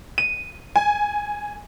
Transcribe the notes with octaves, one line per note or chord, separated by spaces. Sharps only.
D#7
G#5